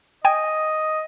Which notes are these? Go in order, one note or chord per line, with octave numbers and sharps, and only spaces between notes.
D#5 G5 G#5